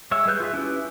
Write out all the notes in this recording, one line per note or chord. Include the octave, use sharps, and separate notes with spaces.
G#3 C#5 E5
G3 G#4 B4 F#6 G6
F4 G#4 E5
C#4 E4 G4 B4